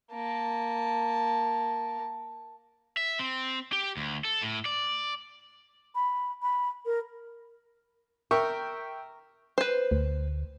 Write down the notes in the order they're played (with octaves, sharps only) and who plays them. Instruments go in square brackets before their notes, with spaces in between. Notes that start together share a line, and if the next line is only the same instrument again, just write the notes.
[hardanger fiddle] A#3 A5
[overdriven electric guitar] E5
C4
G4
D2
A4
A2
D5
[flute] B5
B5
A#4
[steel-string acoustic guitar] A#4 [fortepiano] E5 G5 C#6
[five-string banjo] B4 C5
[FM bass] D2